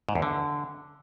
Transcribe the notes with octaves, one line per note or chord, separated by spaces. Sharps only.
G#2
E2
D3